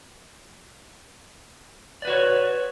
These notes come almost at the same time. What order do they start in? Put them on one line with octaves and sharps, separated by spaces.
D5 B4 F#4 C#5